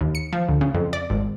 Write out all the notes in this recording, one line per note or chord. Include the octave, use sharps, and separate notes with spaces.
D#2
C#7
F3
D2
C#3
F2
D5
G#1